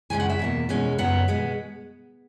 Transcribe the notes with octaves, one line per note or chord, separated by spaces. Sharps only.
F#2 C#3 E3 G#3 C#4 G#5
F#5
E5
E2 B2 A#3
E2 B2 G#3 C#4
F#2 C#3 F#3 B3 F#5
B2 G#3 B3